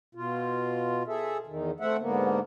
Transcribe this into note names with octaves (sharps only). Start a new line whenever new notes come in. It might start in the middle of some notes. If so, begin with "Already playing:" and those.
B2 F4
G#4 A4 E5
E2 D#3
A3 C4 E5 F#5
G#2 D3 A#3 B3